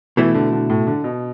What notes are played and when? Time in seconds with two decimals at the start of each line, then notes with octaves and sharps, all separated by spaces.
0.17 B2 E3 A3 E4
0.34 D3
0.52 D3
0.70 A2
0.87 D3
1.04 B2